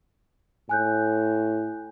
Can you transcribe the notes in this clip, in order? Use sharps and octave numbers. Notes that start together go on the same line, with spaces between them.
A2 G#5 F#6 G6